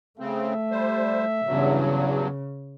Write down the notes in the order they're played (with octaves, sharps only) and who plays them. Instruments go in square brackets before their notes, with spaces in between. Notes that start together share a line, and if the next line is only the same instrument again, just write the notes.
[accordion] C#3 C4 [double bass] A3 [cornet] E5
[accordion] G3 C5
[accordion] E2 G2 F#3 [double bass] C#3